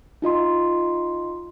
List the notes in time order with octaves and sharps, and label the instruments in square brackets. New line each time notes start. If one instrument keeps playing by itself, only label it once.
[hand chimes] D#4 F4 D#5 C6